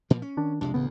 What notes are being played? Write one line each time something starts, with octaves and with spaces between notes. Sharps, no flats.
A#2 F3 A#3
C#4
D#3 D4
C2 F2 C3 G#3 D4
A1 D2 C#3 B3